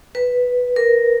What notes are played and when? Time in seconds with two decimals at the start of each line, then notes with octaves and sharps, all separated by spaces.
0.15 B4
0.76 A#4